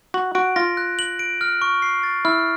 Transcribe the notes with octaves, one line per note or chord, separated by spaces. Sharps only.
F#4 F#7
F#4 D7
F4 A#6
F#6
F#7
D7
F6
C#6
C7
A6
E4 F6